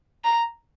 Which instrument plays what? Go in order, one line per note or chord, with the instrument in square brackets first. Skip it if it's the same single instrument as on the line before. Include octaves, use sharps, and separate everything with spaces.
[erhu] A#5